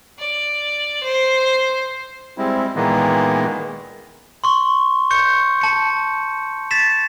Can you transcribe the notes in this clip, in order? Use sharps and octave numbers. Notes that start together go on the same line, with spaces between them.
D5
C5
G3 G#3 C4 E4
A#2 D#3 E3 G#3 A#3 B3
C6 C#6
C#6 G6 C#7
A5 C#7
A6 B6 E7